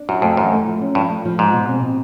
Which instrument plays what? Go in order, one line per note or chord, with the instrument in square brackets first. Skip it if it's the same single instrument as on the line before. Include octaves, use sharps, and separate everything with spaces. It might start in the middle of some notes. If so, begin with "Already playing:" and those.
Already playing: [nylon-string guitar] D4
[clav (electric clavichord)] F#2 [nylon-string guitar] F#4
[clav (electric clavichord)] F2 [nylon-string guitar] A3
[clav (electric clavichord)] F#2 [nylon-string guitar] E3
[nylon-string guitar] A3
F3
C#4
[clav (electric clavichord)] G2 [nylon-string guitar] F3
[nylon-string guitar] A3
F3
[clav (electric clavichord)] G#2 [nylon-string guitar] G#3
[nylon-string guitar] B2
C4
B2